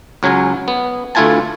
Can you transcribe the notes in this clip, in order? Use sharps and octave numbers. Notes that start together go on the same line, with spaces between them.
C#2 F#3 C#4 G#5
B3
D2 A3 E4 F4 G#5 A5